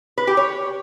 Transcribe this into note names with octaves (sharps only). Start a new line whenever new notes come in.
B4
G4
C#5